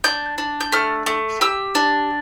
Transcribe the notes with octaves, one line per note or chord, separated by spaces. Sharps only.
D4 G6
D4
G6
A3 F6
A3
G4 E6
D4